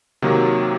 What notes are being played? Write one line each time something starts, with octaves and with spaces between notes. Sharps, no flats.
C3 D#3 F#3 A#3